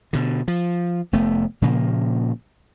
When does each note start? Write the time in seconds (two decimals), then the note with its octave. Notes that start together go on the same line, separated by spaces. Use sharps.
0.13 B2 D3
0.48 F3
1.13 F1 A3 B3
1.62 A#2 C#3 F3 A#3